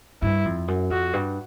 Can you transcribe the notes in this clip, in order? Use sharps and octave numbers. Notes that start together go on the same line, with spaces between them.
G2 E4
F2
F#2
F2 F#4
G2